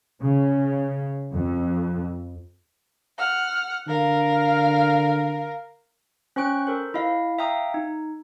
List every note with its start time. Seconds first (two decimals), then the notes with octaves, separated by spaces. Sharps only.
0.20 C#3
1.33 F2
3.18 F#5 F6
3.88 D3 A#4 F5
6.36 C#4 C5 G5 C#6 F#6 D7
6.67 A4 A#4 C5
6.94 E4 D#5 F5
7.39 E5 F5 G5 A#5 D#6
7.74 D#4